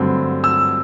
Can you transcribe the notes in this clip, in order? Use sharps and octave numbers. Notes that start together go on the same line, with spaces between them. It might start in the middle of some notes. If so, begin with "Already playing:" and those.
Already playing: G2 D3 F#3 A3 C4
E6